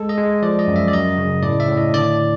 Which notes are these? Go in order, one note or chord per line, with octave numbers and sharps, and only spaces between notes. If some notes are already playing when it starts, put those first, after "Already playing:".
Already playing: G#3 A4
D#5
G#3
F3 D5
D#5
F#2
E5
D5
F#2 D#5
C#3
A2 D5
E5
A2
D#5
D3 D5